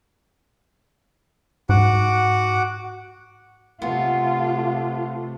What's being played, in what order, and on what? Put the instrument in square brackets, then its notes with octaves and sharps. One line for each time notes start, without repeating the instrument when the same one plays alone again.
[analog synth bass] G#2 [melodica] F#4 F#5 D6
[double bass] C3 A3 [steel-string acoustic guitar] B3 [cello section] F4